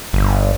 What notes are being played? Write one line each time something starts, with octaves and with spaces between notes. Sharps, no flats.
G1